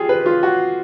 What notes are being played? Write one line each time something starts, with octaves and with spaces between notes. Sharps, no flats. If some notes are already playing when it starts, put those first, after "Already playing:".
Already playing: F4 G4 G#4
B4
F4
F#4